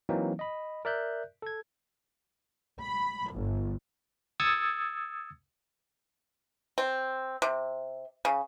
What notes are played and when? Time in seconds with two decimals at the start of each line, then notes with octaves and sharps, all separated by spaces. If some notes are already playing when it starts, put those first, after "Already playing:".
0.09 E3 F#3 A#3 C4 D#4
0.39 D#5 B5
0.85 A#4 D5 E5 F#6 G6
1.42 A4 G#6
2.81 B5
3.33 G1
4.40 D#6 E6 G#6 A6 C#7
6.78 C4
7.42 C3
8.25 C#3